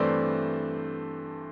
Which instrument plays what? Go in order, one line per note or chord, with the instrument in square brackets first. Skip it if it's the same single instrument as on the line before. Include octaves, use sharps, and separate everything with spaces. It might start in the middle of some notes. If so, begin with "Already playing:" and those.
Already playing: [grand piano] G2 E3 A3 C4 C5 D5